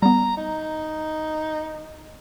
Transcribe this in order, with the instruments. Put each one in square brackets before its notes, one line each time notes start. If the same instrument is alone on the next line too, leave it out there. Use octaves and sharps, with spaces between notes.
[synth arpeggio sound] G3 B3 [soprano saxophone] A#5
[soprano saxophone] D#4